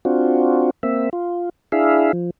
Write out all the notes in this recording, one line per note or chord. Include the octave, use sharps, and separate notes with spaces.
C4 D4 F4 F#4
A#3 C4 E5
F4
D4 E4 G#4 E5 F5
F3